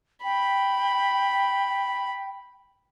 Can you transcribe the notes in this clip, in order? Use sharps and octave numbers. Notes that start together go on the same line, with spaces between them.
G5 B5